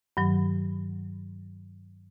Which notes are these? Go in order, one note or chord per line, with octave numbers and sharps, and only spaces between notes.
G2 D#3 F#3